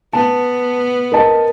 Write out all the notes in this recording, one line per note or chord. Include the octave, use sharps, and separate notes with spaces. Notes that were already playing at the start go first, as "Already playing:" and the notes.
B3 A5
A#4 D#5 A5